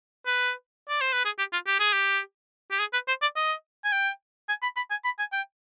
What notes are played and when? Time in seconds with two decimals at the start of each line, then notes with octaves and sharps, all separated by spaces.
0.26 B4
0.88 D5
1.01 C5
1.13 B4
1.25 G#4
1.39 G4
1.53 F4
1.67 G4
1.79 G#4
1.93 G4
2.71 G4
2.79 G#4
2.93 B4
3.08 C5
3.22 D5
3.36 D#5
3.84 G#5
3.92 G5
4.48 G#5
4.62 B5
4.76 B5
4.90 G#5
5.05 B5
5.19 G#5
5.32 G5